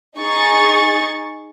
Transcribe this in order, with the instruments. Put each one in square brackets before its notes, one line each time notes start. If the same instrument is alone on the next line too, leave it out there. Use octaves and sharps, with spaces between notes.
[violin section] D#4 G#4 C#6 A6